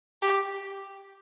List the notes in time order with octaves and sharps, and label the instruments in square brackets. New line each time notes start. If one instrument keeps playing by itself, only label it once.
[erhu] G4